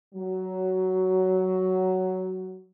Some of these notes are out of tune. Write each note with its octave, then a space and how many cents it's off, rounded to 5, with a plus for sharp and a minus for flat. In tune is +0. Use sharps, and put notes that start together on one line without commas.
F#3 +10